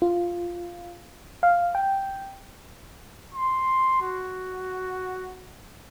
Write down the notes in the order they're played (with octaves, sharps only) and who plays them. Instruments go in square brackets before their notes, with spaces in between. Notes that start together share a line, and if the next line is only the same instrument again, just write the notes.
[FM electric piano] F4
F5
G5
[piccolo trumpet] C6
F#4